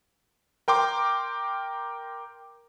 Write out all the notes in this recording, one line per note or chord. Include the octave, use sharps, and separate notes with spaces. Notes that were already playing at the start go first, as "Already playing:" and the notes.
A#4 G5 C6 D6